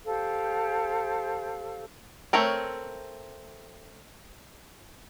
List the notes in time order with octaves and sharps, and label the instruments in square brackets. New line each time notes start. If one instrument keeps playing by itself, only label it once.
[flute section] G4 A4 C5 F5
[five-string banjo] A3 C4 A#4 C#5